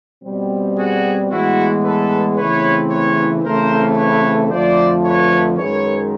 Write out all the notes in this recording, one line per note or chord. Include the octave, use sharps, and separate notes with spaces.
B2 G3 C4
F#4 G#4
A2 E3 G#3 B3 E4 F#4
A4 B4
E2 C#3 E3 A3 C4 B4 C#5
B4 C#5
C#3 E3 A3 C4 A#4 C5
B4 C#5
F2 D3 F3 A3 C5 D5
B4 C#5
F#2 D#3 G#3 B4 C#5